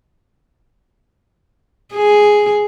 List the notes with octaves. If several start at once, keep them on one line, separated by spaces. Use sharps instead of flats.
G#4